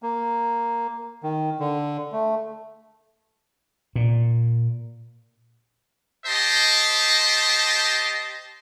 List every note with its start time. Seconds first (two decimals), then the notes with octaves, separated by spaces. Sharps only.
0.03 A#3
1.23 D#3
1.60 D3
2.12 A3
3.95 A#2
6.26 G4 C5 D#5 A5